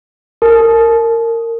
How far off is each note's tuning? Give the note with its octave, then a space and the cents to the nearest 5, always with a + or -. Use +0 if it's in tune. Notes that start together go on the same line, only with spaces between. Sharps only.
A#4 -25 A5 -35